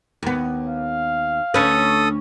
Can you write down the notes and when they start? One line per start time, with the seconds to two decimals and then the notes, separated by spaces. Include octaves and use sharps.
0.23 D#2 B3
0.67 F5
1.54 D2 C#4 A4 B4 D#6